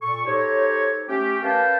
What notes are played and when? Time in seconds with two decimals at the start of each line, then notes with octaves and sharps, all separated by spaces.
0.02 A#2 A4 C#6
0.25 D#4 G4 A4 C5 C#5
1.08 A3 C#4 G4
1.43 A#4 B4 C#5 F5 G5 A5